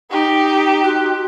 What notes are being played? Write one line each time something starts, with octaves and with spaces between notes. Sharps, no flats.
D#4 G4
F#4 C6